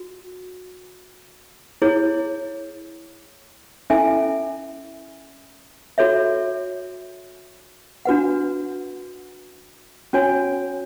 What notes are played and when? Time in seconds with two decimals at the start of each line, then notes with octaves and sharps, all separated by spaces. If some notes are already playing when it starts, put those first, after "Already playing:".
Already playing: F#4
1.82 E4 G#4 C#5
3.90 C#4 E4 A4 E5 G#5
5.98 F#4 A4 C#5 E5
8.05 D4 F#4 B4 F#5
10.13 C#4 F#4 C#5 G#5